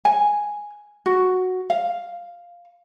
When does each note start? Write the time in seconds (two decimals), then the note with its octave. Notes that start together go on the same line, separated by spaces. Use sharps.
0.05 G#5
1.06 F#4
1.70 F5